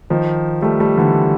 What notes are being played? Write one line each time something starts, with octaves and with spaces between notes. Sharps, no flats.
D#3 F3
G3 A3
G3 A3
D3 E3